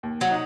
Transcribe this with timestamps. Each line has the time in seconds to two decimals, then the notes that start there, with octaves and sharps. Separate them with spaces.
0.03 D#2
0.21 F#3
0.30 D#4